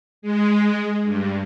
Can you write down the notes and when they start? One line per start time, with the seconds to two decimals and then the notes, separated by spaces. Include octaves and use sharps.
0.22 G#3
1.04 G2